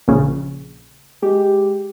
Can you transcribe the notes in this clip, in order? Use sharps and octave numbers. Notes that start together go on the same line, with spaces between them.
A#1 C#3
G#3 G4